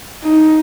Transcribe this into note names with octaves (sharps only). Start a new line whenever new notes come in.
D#4